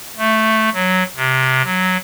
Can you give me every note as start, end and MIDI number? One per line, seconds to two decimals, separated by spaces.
0.18 0.69 57
0.74 1.03 54
1.17 1.62 48
1.64 1.97 54